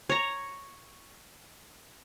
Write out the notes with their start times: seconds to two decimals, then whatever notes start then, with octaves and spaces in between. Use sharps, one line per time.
0.09 C#5 A#5